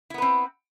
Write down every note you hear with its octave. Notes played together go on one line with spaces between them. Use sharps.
B3 C4 E4 B4